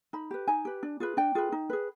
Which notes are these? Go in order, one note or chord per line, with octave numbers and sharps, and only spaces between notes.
D#4 B5
G4 B4
D#4 G#5
G4 B4
D4
F4 G#4 B4
D4 G5
F4 G#4 B4
D#4
G#4 B4